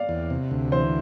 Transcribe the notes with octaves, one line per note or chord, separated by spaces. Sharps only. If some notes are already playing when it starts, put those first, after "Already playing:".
Already playing: D5 F5
E2
C3
D2
E3 C5